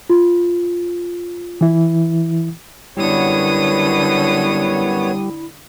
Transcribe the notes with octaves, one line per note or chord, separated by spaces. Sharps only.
F4
E3 E4
F#2 D3 G3 B3 E4 C#5 D#6